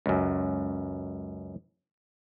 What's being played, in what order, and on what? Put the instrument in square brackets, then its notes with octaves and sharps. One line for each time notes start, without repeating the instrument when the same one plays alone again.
[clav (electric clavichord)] C#2 F#2